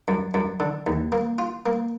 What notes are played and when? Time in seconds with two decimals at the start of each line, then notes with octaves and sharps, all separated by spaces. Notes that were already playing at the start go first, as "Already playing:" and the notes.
0.08 F#2
0.34 F#2
0.60 D3
0.87 D#2
1.12 A#3
1.38 F4
1.66 A#3